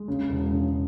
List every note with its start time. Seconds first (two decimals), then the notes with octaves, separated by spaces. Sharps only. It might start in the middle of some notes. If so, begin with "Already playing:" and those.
Already playing: G#3
0.08 C#3
0.29 E1
0.52 C#3